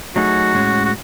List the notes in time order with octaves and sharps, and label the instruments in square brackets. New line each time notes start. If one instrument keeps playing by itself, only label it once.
[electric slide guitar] F#3 A3 D#4 G#4 [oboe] F#4
[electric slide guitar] A2 G#3 C#4
[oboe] F#4